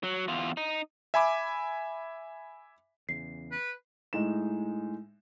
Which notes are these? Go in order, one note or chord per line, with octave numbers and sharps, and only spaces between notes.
F#3
E2 F4
D#4
E5 G#5 B5 D6
E2 C#3 C7
B4
A2 G#3 D#4 E7